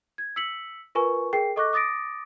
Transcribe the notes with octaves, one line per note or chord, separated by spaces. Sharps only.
G#6
E6 B6 C#7 F#7
F4 A#4 B4 G#5 C#6
G#4 A#4 G5 C7
A4 D#5 C#6 D6 F#6 A#6
D6 D#6 A6 A#6 D7